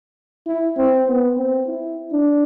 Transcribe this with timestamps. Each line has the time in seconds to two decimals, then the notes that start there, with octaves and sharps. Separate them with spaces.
0.47 E4
0.78 C4
1.07 B3
1.37 C4
1.67 E4
2.12 D4